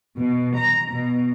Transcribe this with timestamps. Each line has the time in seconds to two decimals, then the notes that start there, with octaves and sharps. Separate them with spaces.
0.17 B2
0.57 A#5
0.92 B2